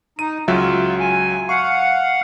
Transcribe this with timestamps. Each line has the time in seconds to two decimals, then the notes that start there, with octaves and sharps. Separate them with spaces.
0.19 D#4 D#7
0.48 C#2 F#3 F4 E5
0.99 G#5
1.49 F5 F#5 C#6